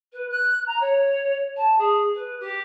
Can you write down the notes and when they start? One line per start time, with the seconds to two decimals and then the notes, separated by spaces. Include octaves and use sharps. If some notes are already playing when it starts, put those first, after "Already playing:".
0.13 B4
0.31 F#6
0.67 A#5
0.80 C#5
1.57 A5
1.78 G#4
2.14 B4
2.40 G4